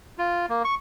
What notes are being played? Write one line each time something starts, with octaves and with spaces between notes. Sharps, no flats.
F4
A#3
C#6